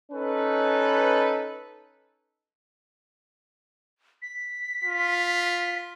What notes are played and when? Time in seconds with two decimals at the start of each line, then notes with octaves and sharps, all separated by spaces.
0.12 C#4 D#4 A4 B4
4.22 B6
4.84 F4